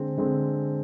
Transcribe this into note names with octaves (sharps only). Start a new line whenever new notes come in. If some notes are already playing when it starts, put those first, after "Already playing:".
Already playing: D3 G#3 C4
D3 G#3 C4